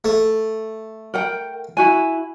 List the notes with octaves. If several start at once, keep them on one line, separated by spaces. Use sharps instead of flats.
A3
A#4 F#5 G5
E4 F#4 G#5